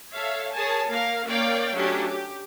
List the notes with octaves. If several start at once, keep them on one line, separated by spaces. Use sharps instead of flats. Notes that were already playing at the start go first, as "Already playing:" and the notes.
A4 C#5 E5 F5
G#4 A#4 C#5 G#5 A5
A#3 A#4 F5
A#3 C#4 C#5 D5 F5 G5
F#3 A3 C#4 D4 G4
G4